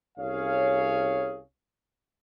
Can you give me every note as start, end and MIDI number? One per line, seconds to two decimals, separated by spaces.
0.18 1.39 36
0.18 1.39 61
0.18 1.39 68
0.18 1.39 73
0.18 1.39 77